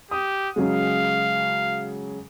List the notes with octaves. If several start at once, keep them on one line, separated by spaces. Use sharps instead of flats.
G4 D#6
C#3 F#3 G#3 F5